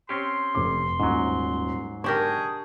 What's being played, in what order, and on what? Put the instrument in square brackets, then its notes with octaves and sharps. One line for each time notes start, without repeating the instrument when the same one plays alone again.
[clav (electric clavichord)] C4 C#4 G4 [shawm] C6
[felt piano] F1 C3 D6
[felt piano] D#1 [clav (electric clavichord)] G#2 F#3
[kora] D4 G4 A#4 [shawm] G#4 [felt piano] C#6